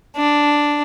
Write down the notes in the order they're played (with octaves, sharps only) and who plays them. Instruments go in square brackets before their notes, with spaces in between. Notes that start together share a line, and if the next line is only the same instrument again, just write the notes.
[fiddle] D4